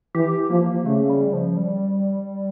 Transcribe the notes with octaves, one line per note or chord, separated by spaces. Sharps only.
E3 G4
F3 A#3
C#3 A3
G3
F3
G3